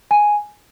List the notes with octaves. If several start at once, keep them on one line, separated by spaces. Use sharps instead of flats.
G#5